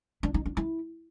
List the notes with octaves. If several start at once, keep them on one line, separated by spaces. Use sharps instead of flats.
D4
D#4
D4
E4